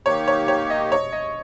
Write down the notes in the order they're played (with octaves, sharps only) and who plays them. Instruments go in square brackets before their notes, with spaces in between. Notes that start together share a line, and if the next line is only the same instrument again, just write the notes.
[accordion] D#3 A#3 D#4 G4 [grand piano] C#5
[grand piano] C#5
C#5
D#5
C#5
D#5